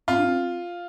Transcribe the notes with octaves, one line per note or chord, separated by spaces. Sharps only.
C4 F4
D4
C4